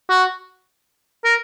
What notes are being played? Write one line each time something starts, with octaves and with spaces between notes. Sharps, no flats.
F#4
A#4